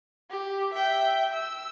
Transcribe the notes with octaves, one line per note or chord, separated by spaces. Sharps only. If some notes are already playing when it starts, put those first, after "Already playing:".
G4
E5 G5
E6